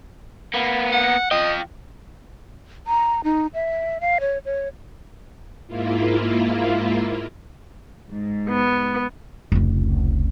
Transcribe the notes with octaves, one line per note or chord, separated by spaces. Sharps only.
A#3 B3
F#5
F4 D#5 G5
A#5
D#4
E5
F5
C#5
C#5
G#2 A#3 E4 F4
G#2
B3
F1 C#2